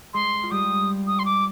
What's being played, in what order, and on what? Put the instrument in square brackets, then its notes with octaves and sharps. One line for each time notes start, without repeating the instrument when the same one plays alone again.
[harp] G#3 G#4 [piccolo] C6
[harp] F4
[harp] G3 G4 [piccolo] D#6
[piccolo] D#6
C6
D6